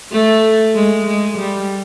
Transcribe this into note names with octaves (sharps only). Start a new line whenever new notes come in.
A3
G#3
G#3
G3